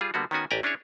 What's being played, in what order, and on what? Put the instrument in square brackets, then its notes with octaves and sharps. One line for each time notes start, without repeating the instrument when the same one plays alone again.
[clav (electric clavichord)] G3 F4 G#4
D3 G3 A#3 B3 F#4
D#3 B3 C#4 F#4 G#5
A1 G4 D5 G5 G#5 A#5
C#4 D4 E4 G#4 C#5